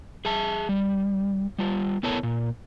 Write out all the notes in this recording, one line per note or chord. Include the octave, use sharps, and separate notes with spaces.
G#4 E5 A5
G3
G3 F4
B3 E4 A4 A#4 C#5 A5
A#2